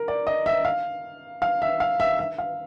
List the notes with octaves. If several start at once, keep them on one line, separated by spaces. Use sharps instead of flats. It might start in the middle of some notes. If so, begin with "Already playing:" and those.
Already playing: A#4
D5
D#5
E5
F5
F5
E5
F5
E5
E5
F5